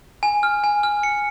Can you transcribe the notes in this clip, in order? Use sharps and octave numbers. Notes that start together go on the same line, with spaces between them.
G#5
F6
G#5
F6
C#7